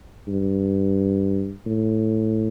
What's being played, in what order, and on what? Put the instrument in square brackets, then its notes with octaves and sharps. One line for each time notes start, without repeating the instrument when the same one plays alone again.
[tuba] G2
A2